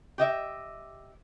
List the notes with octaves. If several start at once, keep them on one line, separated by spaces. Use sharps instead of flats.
G4 D#5 E5